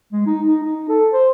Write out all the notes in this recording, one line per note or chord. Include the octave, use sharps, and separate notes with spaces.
G#3
D#4
D#4
D#4
A4
C5